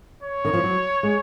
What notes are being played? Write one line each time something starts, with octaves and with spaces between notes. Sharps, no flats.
C#5
D#3
F3
F#3
G#3